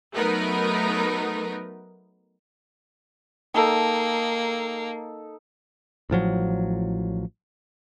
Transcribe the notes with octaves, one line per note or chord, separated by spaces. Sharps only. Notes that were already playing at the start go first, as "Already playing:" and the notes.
F#3 A3 B3 D#4 A#4 B4
A#3 D#4 A4 G5 A5
A1 A2 F3 F#3